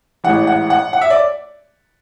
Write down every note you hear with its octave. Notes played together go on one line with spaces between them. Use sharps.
A1 G#2 E3 F#5
F#5
F#5
F#5
E5
D5